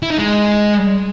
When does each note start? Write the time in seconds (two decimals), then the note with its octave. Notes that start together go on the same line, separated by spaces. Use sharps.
0.03 E4
0.10 D#4
0.18 G#3